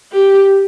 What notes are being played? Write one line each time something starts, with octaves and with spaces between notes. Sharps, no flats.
G4